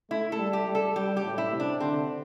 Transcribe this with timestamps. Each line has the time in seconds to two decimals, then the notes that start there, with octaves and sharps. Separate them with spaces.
0.11 A3 E4
0.32 A4
0.39 G3
0.53 G4
0.67 G3
0.75 A4
0.96 G3 G4
1.17 G4
1.24 A2
1.38 E4
1.53 C3
1.60 D4
1.80 D3 C4